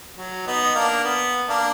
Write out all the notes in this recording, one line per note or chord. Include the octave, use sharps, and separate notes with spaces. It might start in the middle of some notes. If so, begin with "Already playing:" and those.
F#3
B3 D#4
A#3 D4
B3
A#3 D4